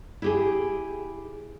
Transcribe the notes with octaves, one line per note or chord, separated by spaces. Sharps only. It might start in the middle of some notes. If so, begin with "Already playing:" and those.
E4 G4 G#4